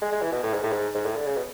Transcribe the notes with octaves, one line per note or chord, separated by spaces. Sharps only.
G#3
G#3
E3
B2
A2
G#2
A2
G#2
G#2
A2
D3
C#3
B2